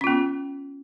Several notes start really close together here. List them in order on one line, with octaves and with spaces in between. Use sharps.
C#4 F4 B3